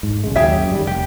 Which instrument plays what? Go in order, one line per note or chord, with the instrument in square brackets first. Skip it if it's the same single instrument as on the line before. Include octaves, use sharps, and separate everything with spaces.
[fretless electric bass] G#2
B1 C#3 G#3
[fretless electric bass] D#2 F#3 [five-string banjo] G4 G#4 E5
[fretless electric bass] F#2
D#3 G3
[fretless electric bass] F1 [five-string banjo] G4